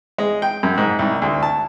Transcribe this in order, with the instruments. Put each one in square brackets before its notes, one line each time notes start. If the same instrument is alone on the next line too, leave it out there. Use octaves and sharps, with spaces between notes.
[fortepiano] G#3
G5
F#2
G#2
C2
D2
A5